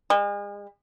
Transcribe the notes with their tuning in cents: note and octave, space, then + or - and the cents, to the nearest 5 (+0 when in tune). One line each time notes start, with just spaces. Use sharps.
G#3 -40